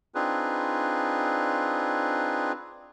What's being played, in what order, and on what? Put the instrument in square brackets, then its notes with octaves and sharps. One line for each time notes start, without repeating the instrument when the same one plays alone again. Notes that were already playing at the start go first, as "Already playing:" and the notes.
[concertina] C4 D4 D#4 F4 G#4 B4